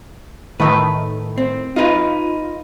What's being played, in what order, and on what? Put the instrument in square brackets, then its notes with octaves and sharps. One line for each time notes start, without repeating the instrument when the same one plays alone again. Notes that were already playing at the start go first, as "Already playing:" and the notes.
[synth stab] A2 D#3 A3 [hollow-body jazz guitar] B4
[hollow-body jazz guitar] C4
[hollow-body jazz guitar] D#4 B4 [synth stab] F4